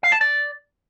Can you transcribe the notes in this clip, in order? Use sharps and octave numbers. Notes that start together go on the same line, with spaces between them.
F5
A5
D5